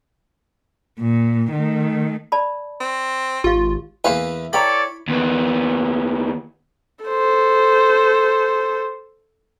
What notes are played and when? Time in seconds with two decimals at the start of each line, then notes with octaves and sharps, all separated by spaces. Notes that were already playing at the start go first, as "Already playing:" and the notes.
0.99 A#2
1.52 D#3 A3
2.32 D5 A5 B5
2.80 C4
3.44 G#1 F4 G4 F5
4.04 E2 A#3 E4 B4 F5 G#5
4.53 A4 B4 C#5 D5 G5 A#5 B5
5.08 D#2 B3
7.05 A4 C5